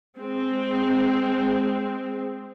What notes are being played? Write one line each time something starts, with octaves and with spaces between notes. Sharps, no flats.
G#3 C4